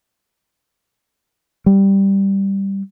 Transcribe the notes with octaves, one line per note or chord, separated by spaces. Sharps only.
G3